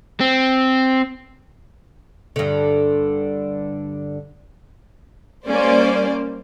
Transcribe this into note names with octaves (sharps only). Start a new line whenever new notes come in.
C4
G2 D3
G3 A#3 C#4 C5 D5